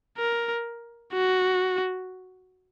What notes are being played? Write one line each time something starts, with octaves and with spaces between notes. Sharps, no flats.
A#4
F#4